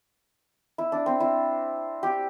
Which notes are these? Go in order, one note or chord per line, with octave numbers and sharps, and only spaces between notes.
E4
D4
C4
E4
G4